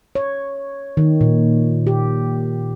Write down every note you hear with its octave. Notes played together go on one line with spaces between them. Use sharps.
C#5
D#3
A#2
G4